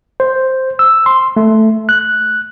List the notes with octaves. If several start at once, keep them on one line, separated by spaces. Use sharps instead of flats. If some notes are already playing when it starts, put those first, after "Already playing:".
C5
E6
C6
A3
F#6